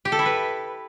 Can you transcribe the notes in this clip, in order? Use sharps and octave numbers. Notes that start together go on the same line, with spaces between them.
G4
A4
E4
B4